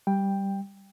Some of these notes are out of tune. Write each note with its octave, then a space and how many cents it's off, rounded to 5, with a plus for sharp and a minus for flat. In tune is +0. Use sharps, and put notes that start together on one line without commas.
G3 +0 G5 +10